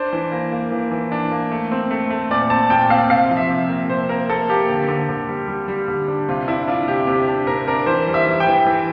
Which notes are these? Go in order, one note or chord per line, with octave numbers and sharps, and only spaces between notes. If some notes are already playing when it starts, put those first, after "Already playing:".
Already playing: D4 C5
E3
A#3
A#3
E3
E3
D4
A#3
A3
C4
A3
A3
A#2 D5
C4 A5
A#2 G5
C4 F5
C3 F5
F3
E5
C3
A#3
C3 C5
A#3 A#4
A#3 A4
A#3 G4
D3
D3
D3
G3
G3
G3
D3
D4
C3 F4
D4 E4
D4 F4
C3 G4
C3 G4
D4
C3 A#4
D4 A#4
E3 C5
G3
E5
E3
G5
E3
E3